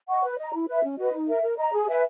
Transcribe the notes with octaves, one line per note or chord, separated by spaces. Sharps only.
D#5 F#5 C#6
B4
D#5
A#5
E4
B4 E5
C#4
F#4 B4 D#5
D#4
A#4 E5
A#4
D#5 A#5
G#4
B4 E5 G#5